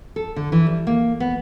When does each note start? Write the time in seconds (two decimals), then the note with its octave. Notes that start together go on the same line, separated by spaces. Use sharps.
0.16 A4
0.36 D3
0.52 E3
0.67 G3
0.87 A#3
1.20 B3